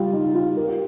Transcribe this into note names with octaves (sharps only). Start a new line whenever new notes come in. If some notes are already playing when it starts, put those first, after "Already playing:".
Already playing: G3 F4 G4
D#4
F4
A#4
G4